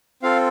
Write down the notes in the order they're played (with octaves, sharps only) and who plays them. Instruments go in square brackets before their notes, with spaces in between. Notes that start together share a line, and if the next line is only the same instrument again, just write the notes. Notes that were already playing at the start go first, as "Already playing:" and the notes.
[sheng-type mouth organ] C4 F4 A4 F5